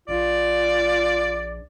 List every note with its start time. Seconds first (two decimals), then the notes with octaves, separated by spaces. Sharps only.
0.08 A#1 F4 D5